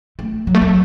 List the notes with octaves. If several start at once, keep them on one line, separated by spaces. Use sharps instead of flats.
A3
F#3
A3
F#3